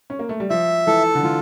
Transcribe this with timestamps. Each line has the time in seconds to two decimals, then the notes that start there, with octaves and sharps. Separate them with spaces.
0.10 C#4
0.19 A#3
0.29 A3
0.40 G3
0.50 F3 E5
0.87 E3 A4
1.15 D3
1.23 E3 F4